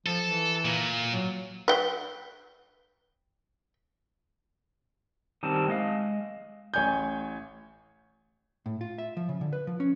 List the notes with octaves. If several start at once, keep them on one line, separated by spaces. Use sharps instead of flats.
F3 A4
E3
A#2
F#3
B4 G5
D#3 G3 C4 A5
G#3 D#5 F5
A1 C#5 G#5 G6
A2
F4
E5
F3
C#3
D3
B4
F3
C#4